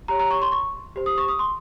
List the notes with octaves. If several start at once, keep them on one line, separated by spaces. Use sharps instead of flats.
G4 C#5 A#5
A#5
C#6
C6
C#6
G4 C5
D#6
C#6
D#6
C6